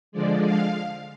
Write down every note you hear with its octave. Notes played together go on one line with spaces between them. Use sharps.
D3 F3 G#3 D5
F5